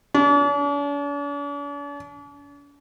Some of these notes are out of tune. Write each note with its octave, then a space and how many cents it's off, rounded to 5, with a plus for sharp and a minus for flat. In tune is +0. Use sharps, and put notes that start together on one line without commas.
D4 -45